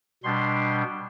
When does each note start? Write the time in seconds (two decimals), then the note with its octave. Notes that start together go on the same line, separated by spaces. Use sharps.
0.24 B2 G3 D4 C6